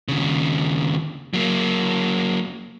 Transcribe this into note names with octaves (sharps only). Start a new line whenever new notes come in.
D#2 C#3
F#3 A#3